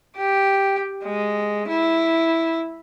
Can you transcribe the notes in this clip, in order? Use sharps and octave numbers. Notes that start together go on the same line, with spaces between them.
G4
G#3
E4